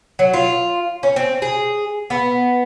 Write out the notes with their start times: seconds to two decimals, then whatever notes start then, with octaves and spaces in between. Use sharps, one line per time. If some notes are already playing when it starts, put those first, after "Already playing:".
0.19 F#3
0.34 F4
1.03 C#4
1.16 C4
1.42 G#4
2.10 B3